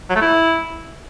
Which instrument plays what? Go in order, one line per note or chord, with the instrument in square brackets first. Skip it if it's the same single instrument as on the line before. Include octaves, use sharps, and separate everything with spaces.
[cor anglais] F#3
A3
E4